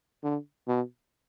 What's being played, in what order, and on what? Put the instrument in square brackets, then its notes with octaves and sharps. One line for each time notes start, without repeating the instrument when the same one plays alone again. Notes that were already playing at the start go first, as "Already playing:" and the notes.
[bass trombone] D3
B2